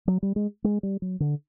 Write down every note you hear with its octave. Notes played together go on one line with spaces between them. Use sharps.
F#3
G3
G#3
G#3
G3
F#3
D3